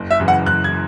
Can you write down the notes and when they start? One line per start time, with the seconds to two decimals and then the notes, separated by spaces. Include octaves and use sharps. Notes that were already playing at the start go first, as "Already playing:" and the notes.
Already playing: F#1
0.11 E5
0.20 F#2 C#3 E3
0.28 F#5
0.46 F#1 F#6
0.64 G#6